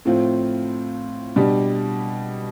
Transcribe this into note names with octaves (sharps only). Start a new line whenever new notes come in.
A2 F3 C4 F4
B2 G3 D4 G4